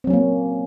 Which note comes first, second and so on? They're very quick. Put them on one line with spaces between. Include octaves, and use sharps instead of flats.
C4 F#3 C#4 A#3